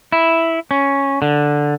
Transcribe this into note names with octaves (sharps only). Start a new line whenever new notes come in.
E4
C#4
D3